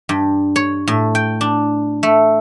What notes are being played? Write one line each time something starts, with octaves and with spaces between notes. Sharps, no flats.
G2
C#5
A2
G5
D4
A3